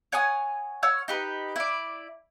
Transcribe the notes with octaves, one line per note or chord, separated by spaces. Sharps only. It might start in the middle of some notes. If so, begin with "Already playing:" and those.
C#5 F#5 G#5 D#6
C#5 F#5 E6 F6
D#4 G4 B4
E4 D5